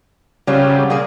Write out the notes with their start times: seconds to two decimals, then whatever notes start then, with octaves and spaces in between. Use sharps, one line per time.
0.48 C#3 F#3 G3 C4 F4
0.90 A#2 A#3 G#4